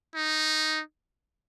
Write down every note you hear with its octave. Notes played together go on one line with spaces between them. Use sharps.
D#4